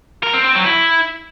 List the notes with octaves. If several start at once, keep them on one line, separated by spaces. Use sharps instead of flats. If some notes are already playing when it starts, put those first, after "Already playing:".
A#4
C4
C4
F#3
E4